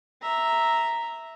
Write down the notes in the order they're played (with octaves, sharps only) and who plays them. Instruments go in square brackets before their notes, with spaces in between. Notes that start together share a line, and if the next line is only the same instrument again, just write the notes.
[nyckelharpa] E5 A#5